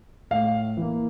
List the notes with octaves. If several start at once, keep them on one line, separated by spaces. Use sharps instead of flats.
A2 F5
E3 A#3